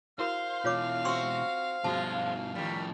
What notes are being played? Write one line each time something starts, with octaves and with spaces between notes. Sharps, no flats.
E4 F#4 A#4 C5 F5
B2 E3 F4 C#5 D6
C4 F#4 C6 C#6 E6
G2 B2 F3 G#3 F#4 A5
A2 D#3 F3 G3